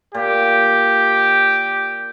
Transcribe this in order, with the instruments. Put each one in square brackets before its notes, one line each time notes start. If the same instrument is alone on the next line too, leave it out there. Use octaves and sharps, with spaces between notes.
[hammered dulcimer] A#2 [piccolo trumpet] G4